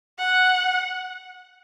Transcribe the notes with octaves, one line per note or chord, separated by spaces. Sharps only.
F#5